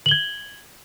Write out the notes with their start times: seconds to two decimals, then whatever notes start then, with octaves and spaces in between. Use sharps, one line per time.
0.06 F#7
0.09 G7
0.11 G#6